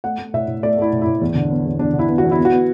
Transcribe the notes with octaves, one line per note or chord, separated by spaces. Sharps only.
A3 F#5
A3
A2 E5
A2
A3 D5
A3 E4
A2
E4
A2
E2
D3
B3
E2
E2 D4
D3
E4
B3
F#4
E2
E4
B3
F#4
B3